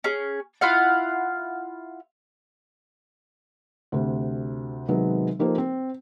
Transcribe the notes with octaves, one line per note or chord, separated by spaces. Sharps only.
C#4 G#4
E4 F4 F5 F#5
D2 C3
C3 D#3 F#3 G#3 B3
F3 A#3 D#4 G4 A4 C5
C4